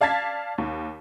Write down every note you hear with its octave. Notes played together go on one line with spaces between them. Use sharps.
D5 F5 A5 G#6 A6 B6
D#2